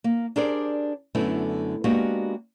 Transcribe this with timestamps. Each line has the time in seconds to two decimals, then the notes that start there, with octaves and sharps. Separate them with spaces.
0.04 A#3
0.36 D4 G4 G#4 A#4 C5 D5
1.15 F#2 D3 A3 B3 E4
1.84 G#3 A#3 B3 D4 F#4 G4